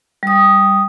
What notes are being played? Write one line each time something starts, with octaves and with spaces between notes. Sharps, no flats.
G3 D#6